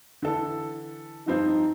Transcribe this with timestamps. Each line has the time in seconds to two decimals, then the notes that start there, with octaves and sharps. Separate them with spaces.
0.22 D3 E3 A4
1.27 G2 F3 C4 D#4